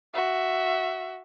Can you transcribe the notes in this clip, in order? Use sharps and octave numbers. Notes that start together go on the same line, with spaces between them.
F#4 E5